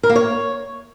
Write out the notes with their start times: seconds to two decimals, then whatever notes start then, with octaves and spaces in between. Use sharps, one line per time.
0.03 A#4
0.09 A#3
0.16 C#5